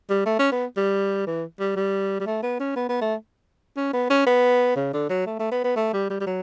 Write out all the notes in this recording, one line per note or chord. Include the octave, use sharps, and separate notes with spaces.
G3
A3
C#4
B3
G3
E3
G3
G3
G3
A3
B3
C#4
B3
B3
A3
C#4
B3
C#4
B3
C#3
D3
F#3
A3
A3
B3
B3
A3
G3
G3
G3
F#3